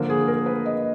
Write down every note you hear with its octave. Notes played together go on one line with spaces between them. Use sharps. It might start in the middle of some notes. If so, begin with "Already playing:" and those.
Already playing: D3 F3 A#3
G#4
A#4
B4
D#5